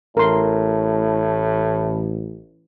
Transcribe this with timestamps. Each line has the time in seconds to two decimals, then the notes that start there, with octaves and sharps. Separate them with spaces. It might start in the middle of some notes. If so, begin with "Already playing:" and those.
0.17 A1 A2 A#4 C6